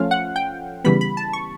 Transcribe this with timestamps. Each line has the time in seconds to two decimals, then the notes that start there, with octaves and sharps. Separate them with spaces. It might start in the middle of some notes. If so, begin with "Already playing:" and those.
Already playing: F3 A3 C#4 F4 F5
0.11 F#5
0.36 G5
0.84 C#3 E3 G3 B3 B5
1.01 B5
1.17 A5
1.33 C#6